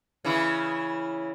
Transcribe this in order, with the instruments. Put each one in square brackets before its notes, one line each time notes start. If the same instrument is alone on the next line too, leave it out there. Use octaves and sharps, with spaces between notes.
[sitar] C#3 E3 E4